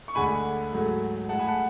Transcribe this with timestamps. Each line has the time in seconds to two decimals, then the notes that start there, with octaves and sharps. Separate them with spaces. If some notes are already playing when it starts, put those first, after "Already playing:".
0.08 C#6
0.15 D2 D3 G#3 G#5 B5
0.72 G#2 F#3 A3
1.29 A2 G#3 F#5 A5
1.39 G#5 B5
1.48 F#5 A5